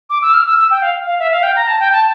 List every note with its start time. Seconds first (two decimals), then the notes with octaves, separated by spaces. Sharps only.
0.10 D6
0.22 E6
0.34 F6
0.46 E6
0.58 E6
0.71 G5
0.82 F5
1.07 F5
1.19 E5
1.31 F5
1.43 G5
1.56 A#5
1.67 A5
1.80 G5
1.92 A5